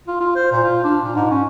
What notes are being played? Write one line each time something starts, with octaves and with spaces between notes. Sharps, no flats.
F4
F4
C5
A#2
F4
D4
A#2
G#2
C#4